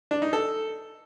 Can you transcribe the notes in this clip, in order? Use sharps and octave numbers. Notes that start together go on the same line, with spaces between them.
D4
D#4
A4